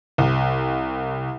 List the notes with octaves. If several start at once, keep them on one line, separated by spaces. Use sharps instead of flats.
C2